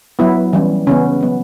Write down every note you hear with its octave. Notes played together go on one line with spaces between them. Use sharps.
F#3 B3 E4
E3 G3 C#4
C#3 E3 B3 C#4
F#3 B3